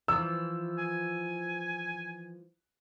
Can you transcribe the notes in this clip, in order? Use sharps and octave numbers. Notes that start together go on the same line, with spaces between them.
E3 F3 E6
G#5